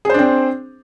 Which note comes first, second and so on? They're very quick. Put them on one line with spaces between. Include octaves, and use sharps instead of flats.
G#4 C5 D4 C4